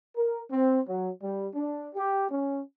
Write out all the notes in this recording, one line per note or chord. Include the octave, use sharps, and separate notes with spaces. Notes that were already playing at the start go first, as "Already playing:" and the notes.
A#4
C4
F#3
G3
D4
G4
C#4